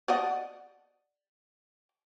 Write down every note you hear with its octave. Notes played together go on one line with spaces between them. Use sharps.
D5 D#5 F#5